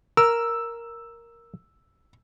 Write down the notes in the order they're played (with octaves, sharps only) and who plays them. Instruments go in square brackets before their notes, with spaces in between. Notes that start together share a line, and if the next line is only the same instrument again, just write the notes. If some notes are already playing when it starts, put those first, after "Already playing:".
[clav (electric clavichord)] A#4 [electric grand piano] E6